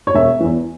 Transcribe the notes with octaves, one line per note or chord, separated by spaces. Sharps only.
C#5
E1 E5
E2 E3